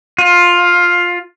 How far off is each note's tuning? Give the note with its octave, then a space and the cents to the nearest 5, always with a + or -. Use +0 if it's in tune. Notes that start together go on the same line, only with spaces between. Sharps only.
F4 +10